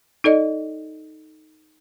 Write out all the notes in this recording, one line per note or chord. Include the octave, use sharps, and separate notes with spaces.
D#4 A4 D5 D#5